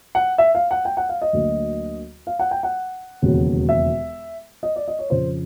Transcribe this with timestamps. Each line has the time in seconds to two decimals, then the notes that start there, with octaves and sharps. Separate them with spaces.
0.15 F#5
0.38 E5
0.55 F5
0.71 F#5
0.85 G5
0.97 F#5
1.09 F5
1.22 D#5
1.33 D2 D3 F#3 A#3
2.27 F5
2.40 F#5
2.51 G5
2.63 F#5
3.22 E1 D#2 C#3 F#3
3.69 E5
4.63 D#5
4.76 D5
4.88 D#5
4.99 C#5
5.10 F2 C#3 F3 C5